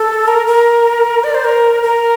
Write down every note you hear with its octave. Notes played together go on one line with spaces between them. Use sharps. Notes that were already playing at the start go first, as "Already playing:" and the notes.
Already playing: A4
A#4
A#4
D5
C5
A#4
A#4